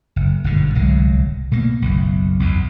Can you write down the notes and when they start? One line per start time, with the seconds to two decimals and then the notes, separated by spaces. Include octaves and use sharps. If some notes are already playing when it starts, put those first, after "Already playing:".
0.16 F#1
0.44 G1 G#2 B2 D3
0.75 D1 C2 F#3 G#3
1.52 B2 A3 A#3
1.82 F#1 B1
2.40 B1 E2